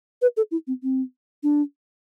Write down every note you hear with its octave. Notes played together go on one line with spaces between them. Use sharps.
B4
A4
E4
C4
C4
D4